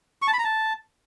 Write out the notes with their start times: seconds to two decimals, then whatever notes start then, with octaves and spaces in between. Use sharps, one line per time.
0.22 C#6
0.28 A5
0.33 B5
0.39 A#5
0.44 A5